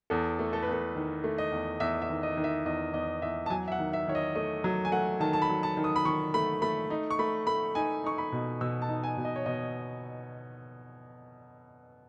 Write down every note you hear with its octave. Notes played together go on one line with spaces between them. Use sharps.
E2 A4
A3
A4
B4
E2
A4
D#3
A3
D#5
E2
E2 E5
E5
D#3
D#5
D#3
E5
E2 D#5
E2 D#5
E2 E5
A5
F#3 G#5
E5
F#5
D#3
E5
D#3 C#5
D#5
A3 D#5
F#3
G#5
A3 F#5
D#3 A5
A5
B5
F#3
A5
D#3
D#6
B5
D#3 C#6
A3 B5
A3 B5
D#4
C#6
A3 B5
A3 B5
D#4 G#5
D#4 C#6
B5
B2
B2 E6
A5
D#4
G#5
B2
D#5
C#5
B2 D#5